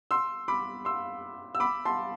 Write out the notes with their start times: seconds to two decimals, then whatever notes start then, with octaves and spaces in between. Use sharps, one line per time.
0.11 C6 E6
0.48 B5 D6
0.85 C6 E6
1.55 E6
1.60 B5 D6
1.85 A5 C6